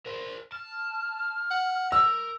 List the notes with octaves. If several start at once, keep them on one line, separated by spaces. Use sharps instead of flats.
A#4 C5
A5 F6
F#5
A#4 E6